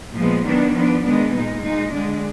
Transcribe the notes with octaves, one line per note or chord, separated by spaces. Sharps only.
A#2 F3 G#3 B3
D#3 F#3 B3 D4
F3 B3 D4
D#3 G#3 B3 D4
A#2 G#3 D#4
A#2 G#3 D#4
D3 G#3 D4